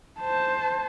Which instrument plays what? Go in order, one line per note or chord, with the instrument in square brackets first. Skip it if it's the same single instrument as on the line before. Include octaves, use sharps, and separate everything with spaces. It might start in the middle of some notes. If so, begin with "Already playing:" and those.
[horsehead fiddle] C5 A5